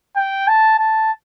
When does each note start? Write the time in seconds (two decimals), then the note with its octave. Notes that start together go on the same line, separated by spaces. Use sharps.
0.17 G5
0.48 A5
0.79 A5